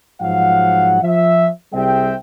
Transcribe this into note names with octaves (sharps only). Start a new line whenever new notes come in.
G#2 F3 F#3 F5 F#5
F3 E5
C2 G3 C4 G#4 E5 G5